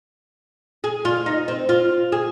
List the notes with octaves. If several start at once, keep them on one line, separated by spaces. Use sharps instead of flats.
G#4
F4
D#4
C4
F4
G#4